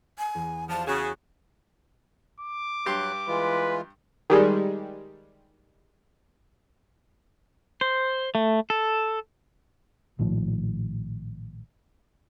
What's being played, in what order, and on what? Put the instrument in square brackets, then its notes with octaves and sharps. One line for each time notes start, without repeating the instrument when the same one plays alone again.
[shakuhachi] G#5
[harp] E2
[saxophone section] F3 [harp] G4 D5 [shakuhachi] A5
[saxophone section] C#3 G#4 [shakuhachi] F#4
[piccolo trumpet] D6
[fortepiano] G2 G4 C6 [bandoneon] F#3 F#6
[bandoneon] E3 G#3 F4 [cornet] B4
[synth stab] D#3 G3 G#3
[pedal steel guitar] C5
A3
A4
[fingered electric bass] A#1 A2 D#3 F3